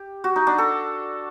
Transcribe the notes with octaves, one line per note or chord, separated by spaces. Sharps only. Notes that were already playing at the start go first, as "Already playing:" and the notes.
Already playing: G4
F#4
D#4
D4
A4